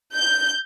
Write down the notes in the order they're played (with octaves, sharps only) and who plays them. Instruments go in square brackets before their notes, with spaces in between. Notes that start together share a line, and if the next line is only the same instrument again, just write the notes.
[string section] G6